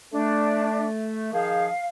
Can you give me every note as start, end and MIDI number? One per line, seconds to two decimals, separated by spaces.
0.13 1.32 57
0.13 0.87 62
1.32 1.67 51
1.32 1.67 53
1.32 1.67 68
1.32 1.88 77